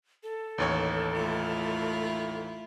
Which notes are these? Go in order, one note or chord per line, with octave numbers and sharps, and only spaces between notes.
A4
A1 D#2 C#5
A3 E4 F4